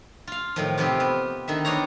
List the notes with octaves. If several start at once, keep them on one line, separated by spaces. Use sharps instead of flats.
F4 F5
A2 D#3 F3
C3 F3 B3 C4 F4 G4
B3
D3 D#3 D#4 E5
B3 D4 D#4 C5 C#5 A#5